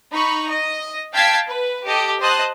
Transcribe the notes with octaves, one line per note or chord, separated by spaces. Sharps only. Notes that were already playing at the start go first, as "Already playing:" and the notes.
D#4 B5 C#6
D#5
F5 G5 A5 G#6 B6 C7
B4
G4 A4 D#5
C5 D#5 A5 D#6 F#6